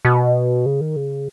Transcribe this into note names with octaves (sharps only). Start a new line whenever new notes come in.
B2
C#3
D#3
C#3